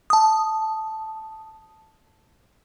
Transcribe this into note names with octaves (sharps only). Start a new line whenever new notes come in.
A5 D#6